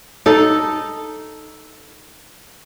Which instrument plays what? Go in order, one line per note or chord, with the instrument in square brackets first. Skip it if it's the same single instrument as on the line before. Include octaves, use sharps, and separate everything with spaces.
[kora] D#4 A4